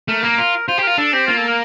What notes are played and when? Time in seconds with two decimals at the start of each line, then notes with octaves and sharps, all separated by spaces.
0.08 A3 A#4
0.23 A#3
0.38 F4
0.68 F4 C5
0.78 G4
0.83 F4 A#4
0.98 D4 A4
1.13 C4 G4
1.27 A#3 F4
1.38 A4
1.48 A#4